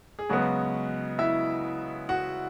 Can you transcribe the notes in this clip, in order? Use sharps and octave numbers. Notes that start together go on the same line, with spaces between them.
G#4
C#3 F#3 G#3 B3 F#4
E4 E5
F#4 F#5